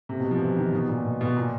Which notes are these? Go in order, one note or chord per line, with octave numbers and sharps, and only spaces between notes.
C3
B2
F3
E3
D#3
B2
A#2
B2
B2
A#2